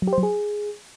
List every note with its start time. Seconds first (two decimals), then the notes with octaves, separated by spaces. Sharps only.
0.02 F#3
0.07 G4
0.13 C5
0.18 F#3
0.23 G#4